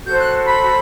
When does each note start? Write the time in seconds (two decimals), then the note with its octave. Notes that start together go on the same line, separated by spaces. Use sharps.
0.04 F#4 A4 C5 G6
0.18 F#6
0.45 B5